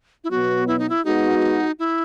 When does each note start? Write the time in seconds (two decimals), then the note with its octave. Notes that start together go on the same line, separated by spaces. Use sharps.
0.24 E4
0.31 B2 F#3 B3 F#4
0.68 E4
0.79 D#4
0.89 E4
1.05 G#3 B3 D#4 F#4
1.79 E4